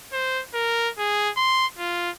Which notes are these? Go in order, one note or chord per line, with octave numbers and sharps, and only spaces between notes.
C5
A#4
G#4
C6
F4